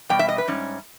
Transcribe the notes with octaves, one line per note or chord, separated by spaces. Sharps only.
B2 G3 G5
E5
D#5
B4
G#2 G3 C#4